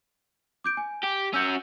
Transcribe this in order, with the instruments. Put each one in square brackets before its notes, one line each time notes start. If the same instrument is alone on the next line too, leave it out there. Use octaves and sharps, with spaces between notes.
[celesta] D6 G6 D7
G#5
[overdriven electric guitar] G4
[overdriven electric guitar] C#4 F#4 [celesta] E6 G6 C#7